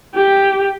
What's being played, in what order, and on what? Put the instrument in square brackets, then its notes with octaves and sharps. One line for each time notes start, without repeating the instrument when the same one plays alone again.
[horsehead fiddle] G4